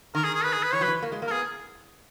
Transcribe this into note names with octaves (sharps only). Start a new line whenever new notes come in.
D#3 A#4
G#4
G#4
B4
G#4
B4
E3 C#5
F#3 B4
E3
A#3
G#3
A#3
A#4
B3 G#4